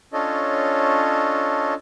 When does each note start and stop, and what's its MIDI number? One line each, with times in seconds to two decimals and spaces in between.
0.13 1.74 61
0.13 1.74 62
0.13 1.74 65
0.13 1.74 69
0.13 1.74 73
0.13 1.74 75